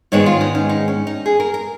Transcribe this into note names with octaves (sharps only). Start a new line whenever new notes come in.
G#2 D#3 G#3 B3 C#5
F4
D#4
C#4
D#4
C#4
D#4
G#4
A#4
A#4